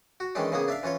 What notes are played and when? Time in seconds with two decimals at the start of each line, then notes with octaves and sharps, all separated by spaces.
0.20 F#4
0.35 D#3 E3 G#3 C#4 D4
0.52 C#3 A#3 B3 G#4
0.68 D4 E5 F5
0.83 E3 C#4 F4 C#5